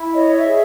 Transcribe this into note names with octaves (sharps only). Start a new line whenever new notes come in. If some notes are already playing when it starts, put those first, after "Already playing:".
Already playing: E4
C#5 D#5
E5
G#4